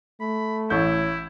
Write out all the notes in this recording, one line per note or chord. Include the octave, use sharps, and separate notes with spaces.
A3 B5
A1 E4 C#6 G6